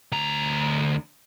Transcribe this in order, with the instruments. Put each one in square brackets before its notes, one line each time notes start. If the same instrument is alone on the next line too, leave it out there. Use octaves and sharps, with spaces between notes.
[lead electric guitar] D2 A#5